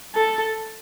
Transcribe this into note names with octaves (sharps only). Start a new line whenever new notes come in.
A4